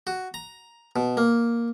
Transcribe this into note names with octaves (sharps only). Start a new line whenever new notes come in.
F#4
A#5
B2
A#3